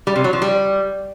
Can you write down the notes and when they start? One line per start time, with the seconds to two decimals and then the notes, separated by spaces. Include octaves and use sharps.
0.07 G3
0.16 C3
0.24 F#3
0.33 F3
0.42 G3